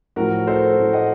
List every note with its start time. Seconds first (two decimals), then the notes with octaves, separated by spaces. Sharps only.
0.16 A2 F3 F#4 A#4
0.47 A4 C5
0.77 A2 F3
0.93 D#5 F#5